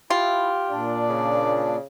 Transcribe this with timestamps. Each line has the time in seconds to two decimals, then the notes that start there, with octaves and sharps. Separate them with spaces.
0.10 E4 F4 G4
0.69 A#2 D4 D5
1.09 C#3